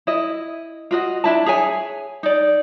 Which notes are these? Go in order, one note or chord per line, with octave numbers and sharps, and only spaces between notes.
E4 D#5
F4 F#4 D#5
D4 E4 A5
G#4 C#5 E5 G#5
D#4 D5